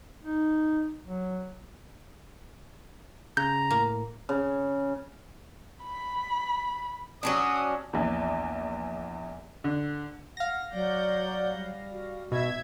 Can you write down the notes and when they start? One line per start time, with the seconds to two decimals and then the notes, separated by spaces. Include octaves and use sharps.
0.23 D#4
1.07 F#3
3.37 C#3 A#5 G6
3.71 A2 A#3
4.29 C#3
5.84 B5
7.23 F#3 C#4 D4 D#6
7.93 A#1 E2
9.64 D3
10.37 F5 F#5 A#6
10.73 F#3 D5 F#5 G6
11.54 G3
11.90 F#4
12.32 G#2 B2 E5 G#6